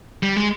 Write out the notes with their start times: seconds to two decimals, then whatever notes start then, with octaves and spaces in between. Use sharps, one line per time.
0.23 G3
0.37 G#3